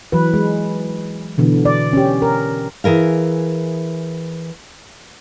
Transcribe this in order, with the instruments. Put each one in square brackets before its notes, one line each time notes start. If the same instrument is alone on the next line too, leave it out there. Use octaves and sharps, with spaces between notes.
[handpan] E3 F#3 B4
G#3
B2 D3 E3
D5
C#4 G4
A#4
[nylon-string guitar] E3 G#4 A#4 F5